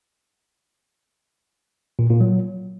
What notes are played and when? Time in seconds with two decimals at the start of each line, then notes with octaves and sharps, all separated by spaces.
1.99 A#2
2.10 A#2
2.21 F#3